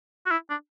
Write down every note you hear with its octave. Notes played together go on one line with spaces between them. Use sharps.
F#4
E4
D4